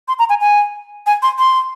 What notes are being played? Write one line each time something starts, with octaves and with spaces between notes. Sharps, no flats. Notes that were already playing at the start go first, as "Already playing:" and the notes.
C6
A#5
G#5
G#5
G#5
C6
C6